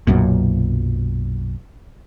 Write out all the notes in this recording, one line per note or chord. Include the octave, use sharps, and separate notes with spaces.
B1 F#2 A#2